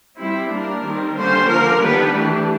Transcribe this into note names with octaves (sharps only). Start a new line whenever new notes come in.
G3 C4 E4
G3 A#3 D4 A#4
D#3 G3 C4
D3 G3 A#3 C#4 C5
D3 F3 A#3 A#4
D#3 G3 B3 D4 B4
E3 A3 D4 G4